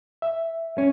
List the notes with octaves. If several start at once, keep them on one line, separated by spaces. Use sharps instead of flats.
E5
C#4